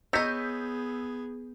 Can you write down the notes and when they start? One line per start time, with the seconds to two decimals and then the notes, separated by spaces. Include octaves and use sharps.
0.13 B3 G#4 C#5 D#5 E6 G6 B6